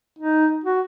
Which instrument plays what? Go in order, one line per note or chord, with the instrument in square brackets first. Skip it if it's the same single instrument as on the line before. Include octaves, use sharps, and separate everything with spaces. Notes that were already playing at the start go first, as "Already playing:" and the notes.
[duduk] D#4
F#4